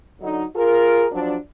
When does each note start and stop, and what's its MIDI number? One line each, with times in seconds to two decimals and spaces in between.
0.21 0.43 50
0.21 0.43 54
0.21 0.43 63
0.56 1.06 65
0.56 1.06 68
0.56 1.06 70
1.12 1.36 53
1.12 1.36 54
1.12 1.36 62